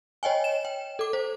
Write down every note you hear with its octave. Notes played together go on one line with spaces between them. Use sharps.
C#5 D#5 G5 G#5
E7
G5
A4 D6
C5